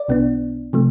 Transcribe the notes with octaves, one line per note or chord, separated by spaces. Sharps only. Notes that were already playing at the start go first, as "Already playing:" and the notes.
Already playing: D5
B1 B2 B3 D4
C3 F3 A3